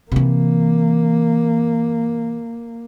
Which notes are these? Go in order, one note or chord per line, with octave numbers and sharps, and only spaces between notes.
C3 E3 A#3